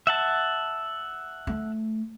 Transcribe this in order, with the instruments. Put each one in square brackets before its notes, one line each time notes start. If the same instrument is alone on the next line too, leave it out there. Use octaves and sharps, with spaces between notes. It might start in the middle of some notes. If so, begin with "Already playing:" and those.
[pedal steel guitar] E5 F#5 A5
[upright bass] A3